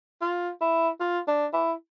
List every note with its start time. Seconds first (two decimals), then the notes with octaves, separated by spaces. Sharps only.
0.21 F4
0.61 E4
1.00 F4
1.28 D4
1.53 E4